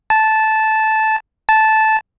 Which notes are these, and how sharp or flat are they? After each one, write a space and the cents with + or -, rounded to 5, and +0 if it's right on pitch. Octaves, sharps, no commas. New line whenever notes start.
A5 -10
A5 -10